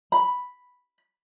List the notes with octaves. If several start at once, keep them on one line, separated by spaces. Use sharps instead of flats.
B5